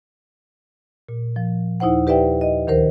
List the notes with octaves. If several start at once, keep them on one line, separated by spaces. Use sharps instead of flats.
A#2
F3
D#2 D#4 E4 C5 F#5
G4 B4 D5 E5 G5
D#5
D2 D#3 A#4 C5